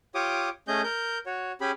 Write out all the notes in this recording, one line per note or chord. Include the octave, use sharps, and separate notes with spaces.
F4 G4 C#5 D6 D#6
A3 C#4 G#4 D#5 G6
A#4 G6
F#4 C#5
C#4 G4 G#4 B5